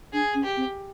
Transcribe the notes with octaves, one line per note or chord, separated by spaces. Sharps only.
D4 G#4
C#4
G4
C4